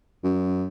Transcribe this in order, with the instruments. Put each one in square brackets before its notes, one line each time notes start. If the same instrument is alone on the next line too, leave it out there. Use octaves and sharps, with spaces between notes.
[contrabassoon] F#2